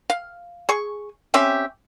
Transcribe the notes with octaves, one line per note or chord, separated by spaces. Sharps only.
F5
G#4 C#6
C4 C#4 G4 E5